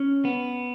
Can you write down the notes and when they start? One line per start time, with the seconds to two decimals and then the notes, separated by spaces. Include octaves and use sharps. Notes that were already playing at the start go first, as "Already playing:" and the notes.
Already playing: C#4
0.25 B3